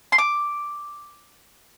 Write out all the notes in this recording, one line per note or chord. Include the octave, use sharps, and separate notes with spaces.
C6
D6